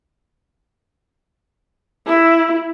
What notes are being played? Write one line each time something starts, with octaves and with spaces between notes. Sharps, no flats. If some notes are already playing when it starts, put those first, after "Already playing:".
E4